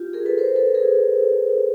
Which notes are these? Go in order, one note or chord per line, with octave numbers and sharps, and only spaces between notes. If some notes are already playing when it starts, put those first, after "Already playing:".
Already playing: F4 G4
G#4 A#4
A4 B4
A#4 C5
A4 B4
G#4 A#4